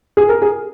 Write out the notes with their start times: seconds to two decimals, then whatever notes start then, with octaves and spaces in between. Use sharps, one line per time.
0.17 G#4
0.29 A#4
0.42 G#4